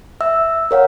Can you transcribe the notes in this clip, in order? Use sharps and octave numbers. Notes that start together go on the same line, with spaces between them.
E5 E6
A#4 C#5 F5 F#5